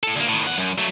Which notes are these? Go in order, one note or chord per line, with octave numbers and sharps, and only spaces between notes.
A2 A4
D2 A#3
A2 D#3
E2 F#5
F#2
F#3 A3